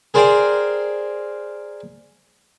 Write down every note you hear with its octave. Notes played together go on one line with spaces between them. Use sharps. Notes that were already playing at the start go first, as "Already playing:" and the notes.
G#4 A#4 C5 D5 G5 G#5